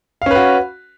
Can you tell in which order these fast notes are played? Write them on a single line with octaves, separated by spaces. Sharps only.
F5 C#4 B4 F#4